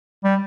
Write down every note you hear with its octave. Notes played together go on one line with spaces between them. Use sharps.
G3